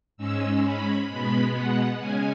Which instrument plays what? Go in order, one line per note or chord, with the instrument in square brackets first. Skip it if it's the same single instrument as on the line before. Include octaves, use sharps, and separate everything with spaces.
[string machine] G#2 G#3 C#4 E6
B5
B2 G#3 B3 B5
F#5
C#3 G#3 C#4 G#5